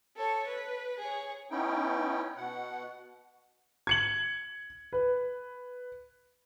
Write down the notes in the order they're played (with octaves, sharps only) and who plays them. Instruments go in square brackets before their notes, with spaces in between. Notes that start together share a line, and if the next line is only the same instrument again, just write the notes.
[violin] A4 C#5
B4
G#4 C#5
[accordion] B3 C#4 D#4 E4 G5
B2 F#5
[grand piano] G#6 C#7 F#7
B4